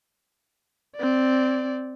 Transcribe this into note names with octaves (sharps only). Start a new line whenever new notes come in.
C4 D5